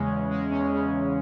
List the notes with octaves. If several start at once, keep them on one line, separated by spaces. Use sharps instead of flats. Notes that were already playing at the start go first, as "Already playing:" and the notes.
Already playing: E2 C#3 G#3 C#4
E2
C#3 G#3
E2 C#4
C#3 G#3
E2